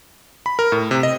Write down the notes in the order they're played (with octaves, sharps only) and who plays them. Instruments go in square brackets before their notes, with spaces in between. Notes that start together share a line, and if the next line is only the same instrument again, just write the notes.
[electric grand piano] B5
A#4
A2
C3
D#5